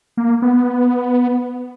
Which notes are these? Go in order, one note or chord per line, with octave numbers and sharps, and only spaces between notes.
A#3
B3